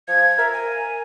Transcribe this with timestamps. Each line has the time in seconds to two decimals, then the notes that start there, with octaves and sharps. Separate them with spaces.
0.08 F3 G#6
0.38 A#4 E5
0.53 G#5